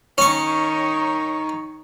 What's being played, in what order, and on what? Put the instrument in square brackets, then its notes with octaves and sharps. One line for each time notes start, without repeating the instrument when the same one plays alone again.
[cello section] D#3 D#4 C#5 [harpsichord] C#4 C#6